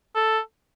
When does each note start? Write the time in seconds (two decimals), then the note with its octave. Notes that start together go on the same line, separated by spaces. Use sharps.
0.15 A4